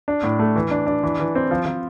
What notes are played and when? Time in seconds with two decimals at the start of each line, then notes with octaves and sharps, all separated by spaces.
0.08 D4
0.23 A2
0.39 A3
0.56 E3
0.71 D4
0.87 D4
1.03 E3
1.19 E3
1.35 C4
1.51 F3
1.66 F3